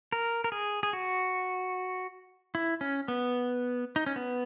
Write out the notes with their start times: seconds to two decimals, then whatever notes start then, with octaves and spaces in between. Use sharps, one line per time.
0.12 A#4
0.44 A#4
0.52 G#4
0.83 G#4
0.93 F#4
2.55 E4
2.81 C#4
3.08 B3
3.96 D#4
4.06 C#4
4.16 B3